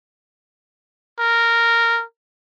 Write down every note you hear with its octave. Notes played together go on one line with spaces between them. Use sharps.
A#4